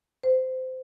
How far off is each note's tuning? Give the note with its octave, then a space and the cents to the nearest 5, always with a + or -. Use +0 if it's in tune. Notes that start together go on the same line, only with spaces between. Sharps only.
C5 -20